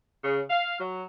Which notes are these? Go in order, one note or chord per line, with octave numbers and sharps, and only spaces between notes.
C#3
F5
F#3